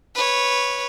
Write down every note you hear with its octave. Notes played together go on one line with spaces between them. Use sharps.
B4 C#5